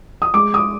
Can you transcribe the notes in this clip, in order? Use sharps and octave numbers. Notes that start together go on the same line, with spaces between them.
D#6
G#3 D6
D#6